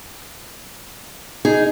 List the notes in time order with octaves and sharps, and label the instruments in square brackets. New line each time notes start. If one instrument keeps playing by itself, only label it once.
[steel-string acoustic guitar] D#4 [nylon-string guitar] G#4